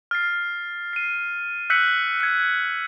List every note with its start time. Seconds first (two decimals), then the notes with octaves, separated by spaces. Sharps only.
0.11 F6 A6 C7
0.93 C7 D#7
1.70 E6 F#6 G6 B6 C#7 F#7
2.20 G#6 C#7